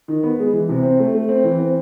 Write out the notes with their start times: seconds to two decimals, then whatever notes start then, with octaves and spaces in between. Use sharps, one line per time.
0.08 D#3
0.23 B3
0.39 G#3
0.53 E3
0.69 C3
0.83 C4
0.99 A3
1.14 A3
1.29 C4
1.44 E3
1.59 C4